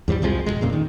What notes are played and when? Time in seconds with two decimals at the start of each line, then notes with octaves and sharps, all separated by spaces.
0.08 E2 G#2 E3 G3
0.22 C2 F2 F3 G#3
0.46 E1 E2 G#3
0.61 F2 A#2 C#3
0.73 D#3